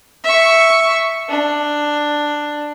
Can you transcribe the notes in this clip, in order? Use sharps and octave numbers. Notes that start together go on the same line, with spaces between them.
E5 C#6
D4